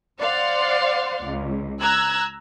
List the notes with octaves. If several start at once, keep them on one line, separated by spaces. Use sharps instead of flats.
C5 D5 F5 F#5 C6
C#2
A#5 E6 F#6 G#6